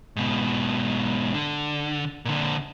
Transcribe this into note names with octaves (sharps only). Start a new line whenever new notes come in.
G#2 B2
D3
A#2 D3